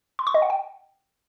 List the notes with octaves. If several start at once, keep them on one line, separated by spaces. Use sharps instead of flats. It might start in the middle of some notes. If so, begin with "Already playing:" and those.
C6
C#6
D#5
F#5
G5